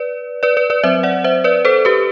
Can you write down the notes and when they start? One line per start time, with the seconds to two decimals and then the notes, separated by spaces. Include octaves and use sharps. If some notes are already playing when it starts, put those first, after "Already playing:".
Already playing: B4 D5
0.43 B4 D5
0.57 B4 D5
0.70 B4 D5
0.83 F#3 C4 C5 E5
1.03 D5 F#5
1.24 C5 E5
1.44 B4 D5
1.65 A4 C5
1.85 G4 B4